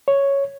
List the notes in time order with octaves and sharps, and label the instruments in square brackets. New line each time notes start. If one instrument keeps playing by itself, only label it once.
[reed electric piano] C#5